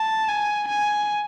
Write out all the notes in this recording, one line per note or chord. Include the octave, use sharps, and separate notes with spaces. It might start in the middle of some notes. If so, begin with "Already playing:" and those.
Already playing: A5
G#5
G#5